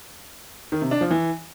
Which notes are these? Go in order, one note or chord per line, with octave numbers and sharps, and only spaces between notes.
D#3
C3
D4
F3
E3